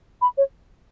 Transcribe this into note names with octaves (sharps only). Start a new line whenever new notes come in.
B5
C#5